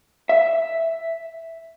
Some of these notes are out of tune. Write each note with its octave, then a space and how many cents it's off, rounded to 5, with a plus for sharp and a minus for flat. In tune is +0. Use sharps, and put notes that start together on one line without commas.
E5 +0